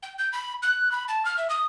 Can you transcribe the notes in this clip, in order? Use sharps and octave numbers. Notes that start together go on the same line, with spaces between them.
G5
G6
B5
F#6
B5
A5
F6
E5
D#6